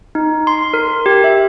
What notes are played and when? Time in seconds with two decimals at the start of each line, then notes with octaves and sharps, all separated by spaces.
0.15 D#4
0.47 C6
0.74 A#4
1.06 G4
1.24 E5